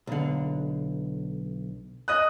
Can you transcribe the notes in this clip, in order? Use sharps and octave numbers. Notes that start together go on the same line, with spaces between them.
B1 D3
D#5 D#6 F#6